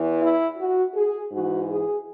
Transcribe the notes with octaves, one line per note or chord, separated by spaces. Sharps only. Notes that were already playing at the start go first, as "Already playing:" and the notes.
Already playing: E2 E3
E4
F#4
G#4
G#2 E3 F#4
G#4